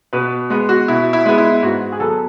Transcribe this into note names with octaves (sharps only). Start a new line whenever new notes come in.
B2 B4
G#3 B3
F#4
B2 E4
E4
G#3 B3
E4
G#2 F#4
G#4
F#3 B3 A4